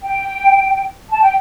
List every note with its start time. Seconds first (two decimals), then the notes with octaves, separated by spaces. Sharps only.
0.01 G5
1.11 A5
1.21 G5